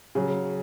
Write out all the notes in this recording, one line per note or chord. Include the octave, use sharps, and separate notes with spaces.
C#3 F#3